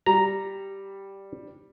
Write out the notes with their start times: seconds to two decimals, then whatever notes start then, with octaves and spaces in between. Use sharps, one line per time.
0.06 G3 A#5